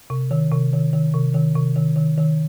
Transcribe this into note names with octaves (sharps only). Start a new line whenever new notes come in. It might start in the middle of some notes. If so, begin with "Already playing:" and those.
C3
D#3
C3
D#3
D#3
C3
D#3
C3
D#3
D#3
D#3